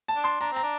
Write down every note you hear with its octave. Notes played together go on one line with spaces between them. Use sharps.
A5
D4
C6
D4 A#5
C4 A#5
D4